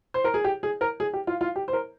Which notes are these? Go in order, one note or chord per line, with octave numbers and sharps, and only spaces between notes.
C5
A#4
G#4
G4
G#4
A#4
G#4
G4
F4
F4
G4
C5
A#4